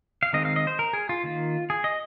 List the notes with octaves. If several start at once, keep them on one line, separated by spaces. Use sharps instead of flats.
F5
D#3 G#3 C4 D#5
F5
D#5
C5
A#4
G#4
F4
D#3 A#3
G#4
D#5